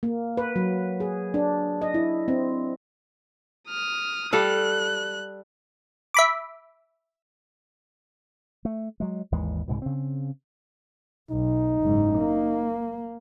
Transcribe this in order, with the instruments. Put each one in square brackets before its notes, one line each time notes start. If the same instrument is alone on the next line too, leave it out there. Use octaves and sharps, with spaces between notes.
[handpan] A#3
B4
F#3
G#4
D4
D#5
E4
C4
[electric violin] D#6 F6
[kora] G3 A4 F5 [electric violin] F#6
[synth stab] E5 B5 D6
[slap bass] A3
F#3 G#3
G#1 D#2 E3 G#3
C2 G#2 B2
C#3 C4
[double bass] B1 [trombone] D#4
[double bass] F#1 G#2
A#3